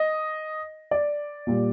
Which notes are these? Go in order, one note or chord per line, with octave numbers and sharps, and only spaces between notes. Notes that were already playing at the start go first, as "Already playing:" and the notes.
Already playing: D#5
D5
A#2 G3